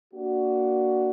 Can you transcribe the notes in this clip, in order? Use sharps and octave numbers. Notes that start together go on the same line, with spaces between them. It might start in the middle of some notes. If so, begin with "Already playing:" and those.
A#3 D4 F#4